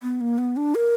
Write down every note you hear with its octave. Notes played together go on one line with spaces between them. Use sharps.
B3
A#3
B3
D4
A#4